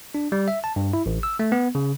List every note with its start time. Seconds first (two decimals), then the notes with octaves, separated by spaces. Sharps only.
0.15 D4
0.32 G3
0.48 E5
0.64 A5
0.76 G2
0.93 E4
1.06 A1
1.23 E6
1.39 A3
1.52 B3
1.75 C#3